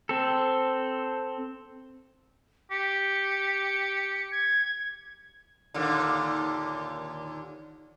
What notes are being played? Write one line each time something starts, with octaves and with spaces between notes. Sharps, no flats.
C4 A4
G4 C#7
G#6
D#2 A#2 D3